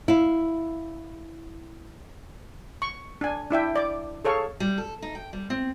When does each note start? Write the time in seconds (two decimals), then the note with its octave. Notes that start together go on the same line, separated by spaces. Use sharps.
0.08 E4 F5
2.82 C#6
3.21 D4 G#5
3.51 D4 E4 E5 G5
3.76 D5 D6
4.25 G#4 A4 C#5 F5 C#6
4.60 G3
4.78 A4
5.02 D#4
5.15 G5
5.33 G3
5.50 C4